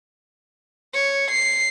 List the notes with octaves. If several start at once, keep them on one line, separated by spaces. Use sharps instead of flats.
C#5
C7